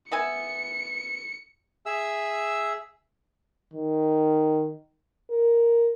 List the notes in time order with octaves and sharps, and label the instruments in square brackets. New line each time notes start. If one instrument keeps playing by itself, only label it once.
[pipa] B3 E5 G#5 [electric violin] C#7
[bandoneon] G#4 E5 E6
[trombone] D#3
[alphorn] A#4